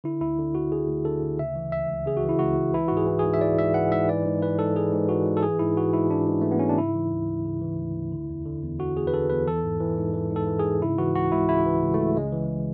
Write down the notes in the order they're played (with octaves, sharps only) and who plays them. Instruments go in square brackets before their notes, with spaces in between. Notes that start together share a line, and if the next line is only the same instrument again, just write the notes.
[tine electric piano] D3 E4
D2 E4
D3
D2 F#4
D3 G#4
D2
D3 A4
D2
C#3 E5
E3
C#2 E5
C#2
C#3 G#4
F#4
E3
E4
C#2 F#4
C#2
E3 E4
G#2 F#4
G#4
E3
G#4
G#2
E5
E3 D5
G#2 E5
E3 F#5
G#2 E5
E3 D5
G#2
E3 B4
G#2 A4
E3 G#4
G#2
E3 F#4
G#2
A4
E3 G#4
G#2 E4
E3 F#4
G#2 E4
E3 D4
G#2
E3 A3
B3
G#2 C#4
D4
C#3 E4
E3
D2
D2
C#3
E3
D2
D2
D3
E2
D3
E2
D3 F#4
E2 G#4
B4
D3 A4
E2 B4
E3 A4
G#2
E3
G#2
E3
G#2
A4
E3
G#4
G#2
C#3 E4
E3 F#4
C#2 F#4
C#2 E4
C#3 E4
E3
C#2
A3
C#2
C#3 G#3
E3